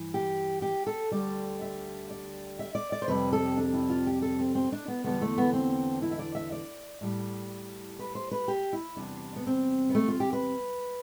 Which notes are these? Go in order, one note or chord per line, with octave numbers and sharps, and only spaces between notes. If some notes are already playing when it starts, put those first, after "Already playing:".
Already playing: G2 E3
G4
G4
A4
D2 D3 G3 D5
E5
D5
E5
D5
D5
C5
F2 C3 G3 B4
A4
D4
E4
F4
G4
A4
C4
C4
D4
B3
E2 D3 G3 B3
A3
B3
C4
E4
E5
D5
E5
D5
A2 G3
B4
C5
B4
G4
E4
E2 C3 G3 D4
B3
C4
B3
A3
F4
G4
B4